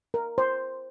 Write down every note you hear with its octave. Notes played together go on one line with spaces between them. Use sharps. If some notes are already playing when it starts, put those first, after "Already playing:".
A#4
C5